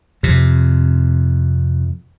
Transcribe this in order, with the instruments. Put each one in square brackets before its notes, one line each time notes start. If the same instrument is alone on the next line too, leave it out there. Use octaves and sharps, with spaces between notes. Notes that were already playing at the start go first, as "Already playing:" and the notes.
[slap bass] F2 C3